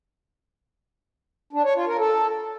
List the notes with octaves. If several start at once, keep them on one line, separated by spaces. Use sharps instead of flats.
D4
C#5
F4
A#4
A4